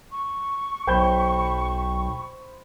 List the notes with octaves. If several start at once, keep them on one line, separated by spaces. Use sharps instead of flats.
C#6
B1 C5 G5 B5 G6